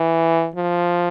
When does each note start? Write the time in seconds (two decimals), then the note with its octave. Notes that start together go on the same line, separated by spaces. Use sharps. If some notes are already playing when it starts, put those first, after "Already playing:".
Already playing: E3
0.56 F3